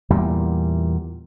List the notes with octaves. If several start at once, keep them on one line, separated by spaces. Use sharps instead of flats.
E2 A#2 G3